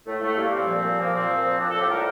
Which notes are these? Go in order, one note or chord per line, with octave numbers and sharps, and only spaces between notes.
A2 A3
A2 A3
G3 A#3
D4
A#2 C4
F3
A#2
F3 A#3
A#2 C4
F3
A#2
F3 D4
A4
A2 G4
G3 A#4